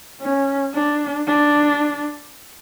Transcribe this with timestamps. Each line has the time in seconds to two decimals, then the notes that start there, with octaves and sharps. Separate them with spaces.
0.21 C#4
0.74 D4
1.27 D4